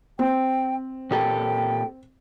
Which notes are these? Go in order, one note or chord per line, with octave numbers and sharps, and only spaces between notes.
C4 G5
A#2 G4 A4 G5